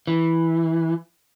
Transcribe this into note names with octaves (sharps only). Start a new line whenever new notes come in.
E3